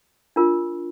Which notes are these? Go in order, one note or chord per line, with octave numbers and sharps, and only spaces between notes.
D4 F4 A#4